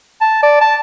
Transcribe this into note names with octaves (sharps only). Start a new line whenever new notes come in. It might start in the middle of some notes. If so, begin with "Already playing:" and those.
A5
D5
A5